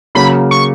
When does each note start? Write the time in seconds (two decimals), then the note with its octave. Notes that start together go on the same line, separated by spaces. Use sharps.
0.15 C#3 F#3 A#3 B5
0.51 C#6